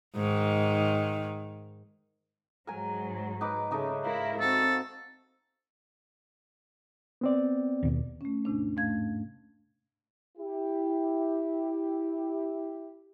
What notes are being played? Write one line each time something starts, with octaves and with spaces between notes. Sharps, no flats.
G#2 D#3
G#2 F#3 A#4 G#5
D#4 B4 D6
C#3 A3 D#4 D6
G#2 E4 A#4 F5
C4 F#4 A4
B3 C4 D5
D#2 B2
A3 C#4
E2 A2 C3 D4
G#2 A3 F5 G#6
E4 G4